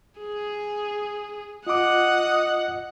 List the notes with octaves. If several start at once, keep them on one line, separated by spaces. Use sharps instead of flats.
G#4
F4 D#5 F#5 D6 D#6